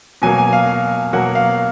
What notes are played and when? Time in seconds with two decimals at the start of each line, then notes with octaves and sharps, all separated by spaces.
0.22 B2 F#3 A#3 G#5
0.38 G#5
0.53 F5
1.13 B2 F#3 A#3 F#5
1.35 F5